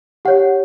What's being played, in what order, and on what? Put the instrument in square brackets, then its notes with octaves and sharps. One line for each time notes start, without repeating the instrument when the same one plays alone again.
[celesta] G4 C#5 F#5